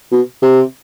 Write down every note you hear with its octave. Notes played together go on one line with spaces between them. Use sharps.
B2
C3